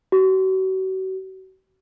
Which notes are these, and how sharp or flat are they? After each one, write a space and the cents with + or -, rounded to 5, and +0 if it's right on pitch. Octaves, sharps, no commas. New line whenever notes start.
F#4 +40